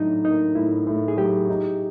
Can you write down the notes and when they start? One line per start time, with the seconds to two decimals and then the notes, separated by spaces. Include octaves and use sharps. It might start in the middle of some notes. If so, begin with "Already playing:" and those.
Already playing: A2 F#3 D4 D#4
0.24 A#3 D#4
0.55 A2 E4
0.87 A2
1.08 G#4
1.17 F#3 G4
1.49 D#4